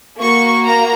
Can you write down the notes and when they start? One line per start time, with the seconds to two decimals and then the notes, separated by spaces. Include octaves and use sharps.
0.19 A#3 F#4 C#6
0.64 A#5